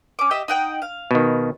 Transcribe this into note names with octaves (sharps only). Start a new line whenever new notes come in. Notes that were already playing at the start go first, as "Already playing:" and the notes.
C#4 D6
G4 D#5 E5
D#4 F#5 G5
F5
B2 D#3